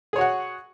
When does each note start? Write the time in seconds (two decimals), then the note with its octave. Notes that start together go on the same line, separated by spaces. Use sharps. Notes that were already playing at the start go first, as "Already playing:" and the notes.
0.13 G#4
0.16 C#5
0.18 F#4
0.21 F#5